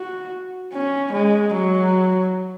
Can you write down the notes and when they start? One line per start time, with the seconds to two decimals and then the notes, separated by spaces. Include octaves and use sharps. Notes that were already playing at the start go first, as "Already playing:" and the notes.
Already playing: F#4
0.73 C#4
1.12 G#3
1.53 F#3